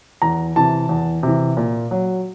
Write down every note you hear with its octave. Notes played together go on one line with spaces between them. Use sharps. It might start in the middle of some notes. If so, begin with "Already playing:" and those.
E2 A#5
C3 E3 A5
E2
C3 E3
A#2
F#3